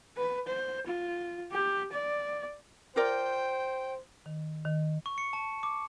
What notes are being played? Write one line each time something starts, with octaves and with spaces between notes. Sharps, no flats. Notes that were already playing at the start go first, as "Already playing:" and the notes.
B4
C5
F4
G4
D5
F4 A#4 C5 D5 G5
D#3
D#3
C#6
C#7
A5
D6